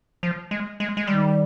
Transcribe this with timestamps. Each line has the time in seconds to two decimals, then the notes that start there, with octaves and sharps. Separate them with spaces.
0.23 F3
0.51 G#3
0.80 G#3
0.97 G#3
1.07 D#3 G3